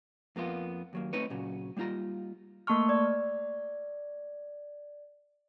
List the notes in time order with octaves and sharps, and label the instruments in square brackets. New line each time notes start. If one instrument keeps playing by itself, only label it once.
[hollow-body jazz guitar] F2 A#3 B3 F4
D#2 F#3 A#3
A3 C4 D#4 B4 C#5
A#2 C#3 F#3
G3 A#3 D#4 F4 A#5
[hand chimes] A3 A#3 A5 C#6 F6
D5